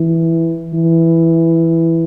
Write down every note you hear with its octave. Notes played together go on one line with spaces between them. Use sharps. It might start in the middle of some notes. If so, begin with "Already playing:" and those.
Already playing: E3
E3